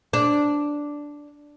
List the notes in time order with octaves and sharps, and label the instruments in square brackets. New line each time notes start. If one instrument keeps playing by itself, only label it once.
[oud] D4